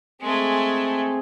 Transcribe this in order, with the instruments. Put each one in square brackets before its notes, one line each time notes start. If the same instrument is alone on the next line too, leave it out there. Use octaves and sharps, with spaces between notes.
[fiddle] G#3 A3 [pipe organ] C4 G#4